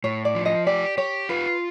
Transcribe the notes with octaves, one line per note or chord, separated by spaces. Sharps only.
A2 C#5
D5
F3
D#5
G4 D5
G4 C#5
F4 B4